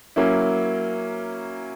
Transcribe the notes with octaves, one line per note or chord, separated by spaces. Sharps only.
F#3 A#3 C#4 E4